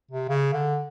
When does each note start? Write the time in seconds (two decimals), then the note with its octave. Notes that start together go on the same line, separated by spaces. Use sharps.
0.11 C3
0.29 C#3
0.53 D3